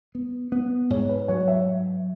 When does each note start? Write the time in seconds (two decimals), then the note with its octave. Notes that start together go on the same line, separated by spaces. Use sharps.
0.15 B3
0.52 B3
0.90 G#2 C#5
1.09 B4
1.28 F#3 C#5
1.48 E5